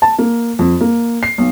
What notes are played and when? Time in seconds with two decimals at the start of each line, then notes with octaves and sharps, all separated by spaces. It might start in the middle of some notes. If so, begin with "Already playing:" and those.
0.02 A5
0.19 A#3
0.59 F2
0.81 A#3
1.23 C7
1.38 B1